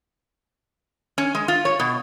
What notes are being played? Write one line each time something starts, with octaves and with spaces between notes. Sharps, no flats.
C#4
G#3
F4
C#5
B2